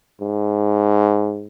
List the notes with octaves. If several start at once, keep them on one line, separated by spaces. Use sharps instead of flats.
G#2